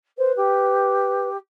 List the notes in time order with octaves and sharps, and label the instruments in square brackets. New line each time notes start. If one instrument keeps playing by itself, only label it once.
[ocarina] B4 [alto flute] C5
[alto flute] G4